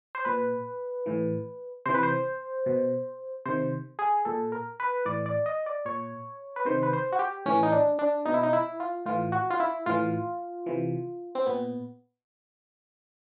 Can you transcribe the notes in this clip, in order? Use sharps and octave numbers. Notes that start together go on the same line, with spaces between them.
C5
A#2 B4
A2 E3
C3 E3 C5
B4
C5
B2
C3 D#3 C5
G#4
A#2 A4
A#4
B4
A2 E3 D5
D5
D#5
D5
A#2 C#5
B4
C3 D#3 C5
B4
C5
F#4
G4
A2 E3 C#4
D#4
D4
D4
B2 D#4
E4
D#4
E4
F4
A2 E3 F4
F#4
F4
E4
A2 E3 F4
C3 E3
C4
A#2 B3